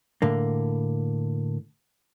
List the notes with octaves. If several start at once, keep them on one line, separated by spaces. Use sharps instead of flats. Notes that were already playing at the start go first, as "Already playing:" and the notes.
A2 D3 A#3